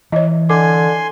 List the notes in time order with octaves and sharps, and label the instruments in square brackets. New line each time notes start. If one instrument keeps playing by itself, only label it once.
[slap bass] E3 [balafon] C#5 D#5
[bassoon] D3 [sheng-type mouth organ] G#5 C6 [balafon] D6